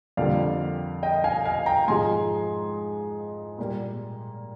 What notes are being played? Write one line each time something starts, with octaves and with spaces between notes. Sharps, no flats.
F2 D3 G3 A#3 D5 F5
D#5 G5
F5 G#5
F5 G#5
G5 A#5
G#2 F3 G#3 G#5 C6
A#2 G3 A#3